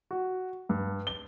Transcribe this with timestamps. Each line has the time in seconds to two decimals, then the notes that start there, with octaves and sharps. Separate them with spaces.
0.11 F#4
0.69 G2
1.07 G7